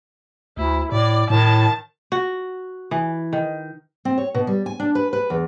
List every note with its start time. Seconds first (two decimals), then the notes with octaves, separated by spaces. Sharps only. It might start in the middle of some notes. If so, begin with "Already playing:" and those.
0.57 D2 E4
0.92 A2 D5
1.30 A2 D#3 A5
2.12 F#4
2.91 E3
3.33 D#3
4.05 C4
4.18 C#5
4.34 B2
4.47 G3
4.66 G#5
4.80 D4
4.95 B4
5.13 B4
5.30 E2